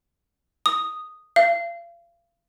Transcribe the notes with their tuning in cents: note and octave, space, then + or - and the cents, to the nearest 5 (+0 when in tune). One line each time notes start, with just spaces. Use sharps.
D#6 -5
F5 -35